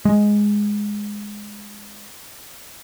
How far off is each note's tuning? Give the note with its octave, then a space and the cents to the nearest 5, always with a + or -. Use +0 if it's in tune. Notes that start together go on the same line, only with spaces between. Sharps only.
G#3 -5